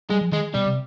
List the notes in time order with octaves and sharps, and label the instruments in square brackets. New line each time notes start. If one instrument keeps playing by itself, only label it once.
[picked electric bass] G3 [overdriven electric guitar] G#3
[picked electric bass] F3
[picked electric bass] D#3 [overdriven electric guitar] G#3
[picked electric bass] B2 [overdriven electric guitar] G3
[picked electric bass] C3